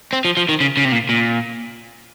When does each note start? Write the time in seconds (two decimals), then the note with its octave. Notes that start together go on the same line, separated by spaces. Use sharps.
0.13 C4
0.25 F3
0.37 F3
0.49 D#3
0.61 C#3
0.77 C#3
0.85 C3
0.92 A#2
1.09 A#2